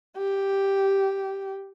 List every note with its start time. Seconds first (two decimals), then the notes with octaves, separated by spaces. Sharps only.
0.17 G4